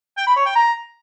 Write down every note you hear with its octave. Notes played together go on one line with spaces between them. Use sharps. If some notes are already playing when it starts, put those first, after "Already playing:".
G5
B5
C#5
G5
A#5